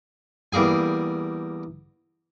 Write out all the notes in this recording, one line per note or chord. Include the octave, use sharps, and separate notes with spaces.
E2 G3 A#3 G#4 G#5